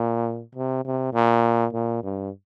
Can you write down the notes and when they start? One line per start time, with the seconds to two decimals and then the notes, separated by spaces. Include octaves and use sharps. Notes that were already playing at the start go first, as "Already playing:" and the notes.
Already playing: A#2
0.55 C3
0.84 C3
1.13 A#2
1.73 A#2
2.03 G2